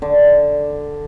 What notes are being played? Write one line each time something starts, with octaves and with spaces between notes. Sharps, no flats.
D3